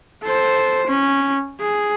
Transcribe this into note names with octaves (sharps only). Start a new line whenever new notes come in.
A4 C5
C#4
G#4